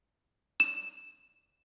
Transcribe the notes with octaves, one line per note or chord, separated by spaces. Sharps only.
E7